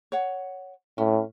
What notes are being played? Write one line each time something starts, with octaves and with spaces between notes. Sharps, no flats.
C#5 F#5
A2 C#4